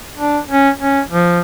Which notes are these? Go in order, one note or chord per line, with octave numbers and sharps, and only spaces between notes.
D4
C#4
C#4
F3